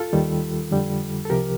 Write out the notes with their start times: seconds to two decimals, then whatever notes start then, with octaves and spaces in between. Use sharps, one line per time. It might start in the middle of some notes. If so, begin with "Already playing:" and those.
Already playing: F4 A4
0.13 D#2 D#3 G3
0.71 F2 D3 G3
1.25 A4
1.30 C2 C3 F3 G4 A#4